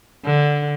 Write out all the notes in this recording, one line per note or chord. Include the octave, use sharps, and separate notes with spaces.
D3